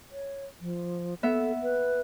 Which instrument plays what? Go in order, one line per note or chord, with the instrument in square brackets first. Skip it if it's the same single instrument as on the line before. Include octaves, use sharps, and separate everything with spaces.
[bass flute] C#5
F3
[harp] B3 E5 [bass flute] A4
[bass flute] B4